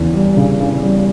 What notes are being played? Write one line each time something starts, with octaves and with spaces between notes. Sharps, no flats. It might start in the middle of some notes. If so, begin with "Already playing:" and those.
Already playing: E2 C#3
G3
C#3
C#3
G3